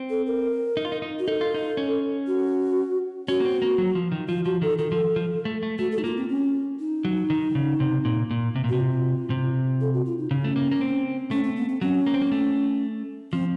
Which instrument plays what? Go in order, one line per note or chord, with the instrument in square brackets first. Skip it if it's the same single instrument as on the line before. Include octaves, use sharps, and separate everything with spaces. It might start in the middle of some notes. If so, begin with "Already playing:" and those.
Already playing: [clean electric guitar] C4
[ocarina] A4
A#4
[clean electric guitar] D#4
F4
D#4
D#4
[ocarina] F#4
[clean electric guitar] D#4 [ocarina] A4
[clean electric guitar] F4
D#4
C#4
[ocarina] F#4
[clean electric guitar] C#4 [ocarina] F#4
[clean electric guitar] A#3
C4
A#3
F#3
F3
D#3
[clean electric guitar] F3 [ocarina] F4
[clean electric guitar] F3 [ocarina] F#4
[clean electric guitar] D#3 [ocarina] A4
[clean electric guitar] D#3 [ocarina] A4
[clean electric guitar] F3
F3
A3
A3
[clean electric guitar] A3 [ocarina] F#4
[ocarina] A4
[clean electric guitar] A3 [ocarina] D#4
[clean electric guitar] A#3 [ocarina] F4
[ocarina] C4
C#4
D#4
[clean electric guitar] F#3
D#3
C#3
C3
A#2
A#2
C3
A#2
[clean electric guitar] C3 [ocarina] F#4
[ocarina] F4
[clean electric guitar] C3
[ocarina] A4
F#4
F4
D#4
[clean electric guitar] C#3 [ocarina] C#4
[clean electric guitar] A3
A#3
A#3
C4
[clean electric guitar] A3 [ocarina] C#4
[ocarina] C4
A#3
C4
[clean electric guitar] F#3 [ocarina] C#4
[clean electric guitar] A#3
C4
A#3
A3
[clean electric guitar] F3 [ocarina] C4